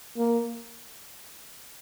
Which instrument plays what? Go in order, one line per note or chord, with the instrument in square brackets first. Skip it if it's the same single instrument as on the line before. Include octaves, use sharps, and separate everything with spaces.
[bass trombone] A#3